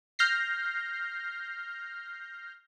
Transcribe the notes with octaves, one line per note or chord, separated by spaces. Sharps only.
F6 G6 A#6 C7